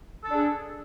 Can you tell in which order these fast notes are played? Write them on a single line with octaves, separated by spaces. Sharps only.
A4 D4 G#4